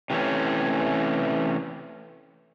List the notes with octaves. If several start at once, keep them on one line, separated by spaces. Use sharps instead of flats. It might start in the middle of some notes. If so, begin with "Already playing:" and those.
C3 E3 F#3 A3 C#4